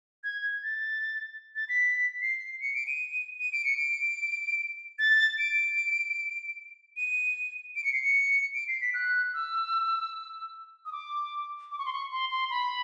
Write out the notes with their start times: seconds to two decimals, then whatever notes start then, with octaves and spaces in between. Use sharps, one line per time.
0.24 G#6
0.63 A6
1.55 A6
1.69 B6
2.22 C7
2.61 C#7
2.74 D7
2.87 D#7
3.40 D#7
3.52 D7
3.65 C#7
3.77 D7
4.99 A6
5.38 D7
6.97 D#7
7.76 D7
7.84 C#7
7.93 C7
8.02 C#7
8.55 D7
8.68 C7
8.81 B6
8.94 F#6
9.34 E6
10.85 D#6
10.92 D6
11.71 D6
11.78 C#6
11.86 C6
11.93 C#6
12.11 C6
12.31 C6
12.50 B5